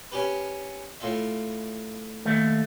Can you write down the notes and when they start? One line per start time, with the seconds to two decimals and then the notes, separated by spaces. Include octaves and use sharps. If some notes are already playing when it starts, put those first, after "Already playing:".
0.12 C#4 G4 B4
1.01 A2 F4 E5
2.25 D#2 A3